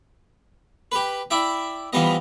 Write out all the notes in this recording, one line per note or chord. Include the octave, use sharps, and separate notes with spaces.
G4 B4
E4 D5 E5 G5
E3 F3 G3 B3 D#5